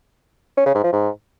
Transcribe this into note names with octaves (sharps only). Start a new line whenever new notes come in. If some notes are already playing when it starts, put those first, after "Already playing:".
C#4
C#3
G#2
F3
G#2